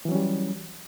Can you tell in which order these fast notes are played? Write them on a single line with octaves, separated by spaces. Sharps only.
E3 F#3 C#4 G3